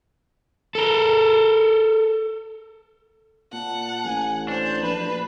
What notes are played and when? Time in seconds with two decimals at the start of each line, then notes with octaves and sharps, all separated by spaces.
0.75 A4 A#4
3.53 A#2 F#5 A5
4.04 A1 G#5
4.48 D4 C5
4.83 A#1 B4 B5